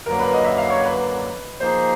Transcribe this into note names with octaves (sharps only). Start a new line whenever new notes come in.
F#2 D3 F#3 A#3 A#4
B4
D#5
E5
F5
C#5
B4
F3 A#3 D#4 G#4 C5